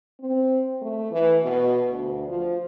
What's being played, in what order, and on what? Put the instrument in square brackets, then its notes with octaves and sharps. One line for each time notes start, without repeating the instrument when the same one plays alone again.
[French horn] C4
A3
E3
B2
D2
F3